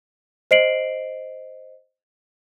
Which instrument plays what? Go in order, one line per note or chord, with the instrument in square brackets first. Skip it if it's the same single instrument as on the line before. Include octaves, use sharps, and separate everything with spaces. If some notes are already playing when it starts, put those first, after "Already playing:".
[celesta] C5 D#5 C7 D7 F#7